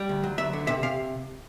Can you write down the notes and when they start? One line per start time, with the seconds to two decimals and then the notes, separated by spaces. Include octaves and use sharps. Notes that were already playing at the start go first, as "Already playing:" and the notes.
Already playing: G3
0.09 D2
0.24 F#3
0.38 D2 E5
0.53 D3
0.67 C3 E5
0.83 C3 F5